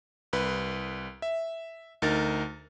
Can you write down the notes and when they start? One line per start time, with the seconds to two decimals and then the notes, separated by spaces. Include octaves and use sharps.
0.33 C2 B4
1.22 E5
2.02 D2 D#4 A#4 A6